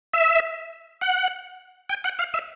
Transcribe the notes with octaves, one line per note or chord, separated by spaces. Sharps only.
E5
F#5
G5
F#5
F5
E5